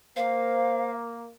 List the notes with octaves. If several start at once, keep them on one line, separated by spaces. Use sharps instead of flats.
A#3 C5 F5